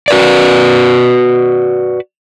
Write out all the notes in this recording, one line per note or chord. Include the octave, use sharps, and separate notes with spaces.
F#4 B4 D5